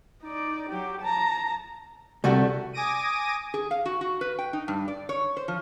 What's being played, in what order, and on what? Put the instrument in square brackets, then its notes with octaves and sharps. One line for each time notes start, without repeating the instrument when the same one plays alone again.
[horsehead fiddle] D#4 D5
F#3 G4
A5 A#5
[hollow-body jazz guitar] C2 [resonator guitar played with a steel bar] G3 A3 F#4
[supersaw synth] G#5 D6 D#6 A#6 D7 D#7
[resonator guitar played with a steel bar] G#4
F5
F#4
F#4
B4
G5
D#4
G2
D5
C#5
C5
F3